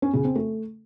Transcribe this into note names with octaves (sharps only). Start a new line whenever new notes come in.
C#4
C#3
C4
A3